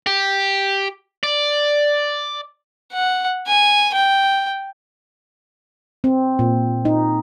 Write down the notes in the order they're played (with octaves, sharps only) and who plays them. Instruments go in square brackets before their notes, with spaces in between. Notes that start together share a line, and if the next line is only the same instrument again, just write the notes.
[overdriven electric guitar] G4
D5
[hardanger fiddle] F#5
G#5
G5
[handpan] C4
A#2
D#4